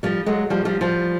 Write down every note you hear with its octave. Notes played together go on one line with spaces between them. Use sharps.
F3 G3
F#3 G#3
F3 G3
F3 G3
F3 G3